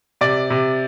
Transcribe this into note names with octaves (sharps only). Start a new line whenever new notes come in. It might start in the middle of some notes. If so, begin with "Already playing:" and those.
C3 D5
C3